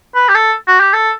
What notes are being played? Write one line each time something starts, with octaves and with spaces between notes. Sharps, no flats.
B4
G4
A4
F#4
G4
A4